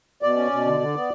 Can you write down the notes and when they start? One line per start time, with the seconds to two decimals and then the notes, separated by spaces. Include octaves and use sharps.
0.22 B2 D5
0.37 C#4
0.52 B2
0.66 D3
0.80 D3
0.95 B3